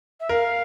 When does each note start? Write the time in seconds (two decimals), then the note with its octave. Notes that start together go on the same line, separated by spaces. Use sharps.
0.20 E5
0.29 A#4 F5